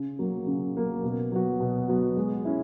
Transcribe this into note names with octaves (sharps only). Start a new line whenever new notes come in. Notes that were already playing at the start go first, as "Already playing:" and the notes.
Already playing: C#3
F#3 A#3
C#3
F#3 A#3
B2
F#3 B3 F#4
B2
F#3 B3 F#4
G#3
C#4 E4